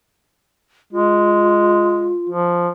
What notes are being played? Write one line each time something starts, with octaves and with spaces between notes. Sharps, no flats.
G#3 F4
F3